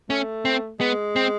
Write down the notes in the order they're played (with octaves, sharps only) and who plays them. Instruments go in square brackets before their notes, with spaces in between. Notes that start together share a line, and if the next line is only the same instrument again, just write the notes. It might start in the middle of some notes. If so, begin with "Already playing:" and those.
[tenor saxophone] A3 [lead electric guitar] C#4
[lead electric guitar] C4
[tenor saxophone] G#3 [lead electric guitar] B3
[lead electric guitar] C4